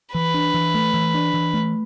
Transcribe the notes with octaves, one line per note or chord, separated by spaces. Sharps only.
E3 B4
D4
E3
A3
E3
D4
E3
A3